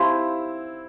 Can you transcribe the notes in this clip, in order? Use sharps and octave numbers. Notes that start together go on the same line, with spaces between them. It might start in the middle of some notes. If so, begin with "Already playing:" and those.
Already playing: C4 E4 G4 F5 A5 C6